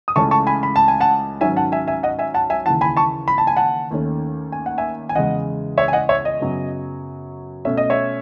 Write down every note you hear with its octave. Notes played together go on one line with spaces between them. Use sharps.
D#6
C#2 C#3 E3 A3 C#4 A5 C#6
A5 C#6
G#5 B5
B5
A5
G#5
F#5 A5
G#2 D#3 F#3 C#4 E5 G#5
F#5 A5
E5 G#5
E5 G#5
D#5 F#5
E5 G#5
F#5 A5
E5 G#5
D#2 C#3 E3 F#5 A5
G#5 B5
A5 C#6
B5
A5
G#5
F#5 A5
D#2 D#3 A3 C#4
G#5
F#5
E5 G#5
G#5
E2 C#3 G#3 D#5 F#5
C#5 E5
G#5
D#5 F#5
C#5 E5
D#5
F#2 C#3 F#3 B3
B2 A3 C#4 E5
D#5
C#5 E5